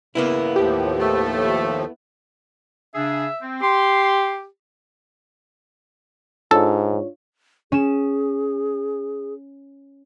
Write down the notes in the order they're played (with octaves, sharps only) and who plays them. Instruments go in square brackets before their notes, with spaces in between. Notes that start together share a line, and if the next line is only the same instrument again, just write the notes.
[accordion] C#3 [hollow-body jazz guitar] A#3 B3 E4
[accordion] D#2 A2 F3 [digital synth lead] G4
[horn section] A3
[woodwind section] C#3 D4 G#4 [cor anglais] E5
[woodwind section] C4
[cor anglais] G4 [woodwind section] C6
[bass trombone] G#2 [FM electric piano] D4 F4 C#5 [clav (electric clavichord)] A4
[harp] C#4 E7 [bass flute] G#4